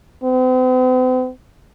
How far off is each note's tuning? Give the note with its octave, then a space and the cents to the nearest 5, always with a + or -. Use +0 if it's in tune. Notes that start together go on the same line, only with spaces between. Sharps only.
C4 -45